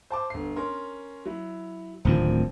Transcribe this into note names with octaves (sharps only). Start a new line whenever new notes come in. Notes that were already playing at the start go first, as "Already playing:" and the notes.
C5 A5 D6
G1 C7
C#4 A#4 C6
F#3 E4
D1 D2 D#3 F3 A#3 C4